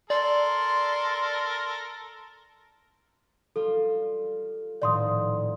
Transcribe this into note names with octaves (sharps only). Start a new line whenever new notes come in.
A4 A#4 D5 C6
G3 F4 A4
D#1 A2 F3 D5 C6 D#6